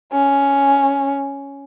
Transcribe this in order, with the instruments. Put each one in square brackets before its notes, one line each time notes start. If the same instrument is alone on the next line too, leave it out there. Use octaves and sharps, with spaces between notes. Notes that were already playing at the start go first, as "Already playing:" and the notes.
[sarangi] C#4